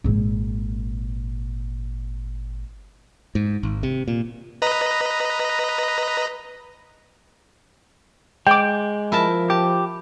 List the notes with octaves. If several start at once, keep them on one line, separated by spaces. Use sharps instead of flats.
G#1 A#2
G#2
G#1
C3
A#2
B4 D#5 A#5
G#3 G5 D6
F3 E4 A#4 A5
G4 A5